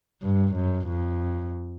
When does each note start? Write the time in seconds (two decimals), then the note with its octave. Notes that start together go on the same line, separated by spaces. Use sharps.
0.22 G2
0.55 F#2
0.88 F2